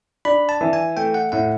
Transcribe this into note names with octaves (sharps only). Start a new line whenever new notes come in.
D4 B5
A5
E3
G#5
A3 G5
F#5
A2 F#5